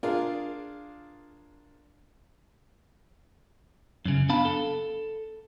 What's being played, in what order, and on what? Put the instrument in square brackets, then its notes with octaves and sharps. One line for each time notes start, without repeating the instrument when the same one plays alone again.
[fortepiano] D4 F4 G#4 A#4
[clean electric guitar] F#2 C#3
B3 D4 F5 A5 B5
A4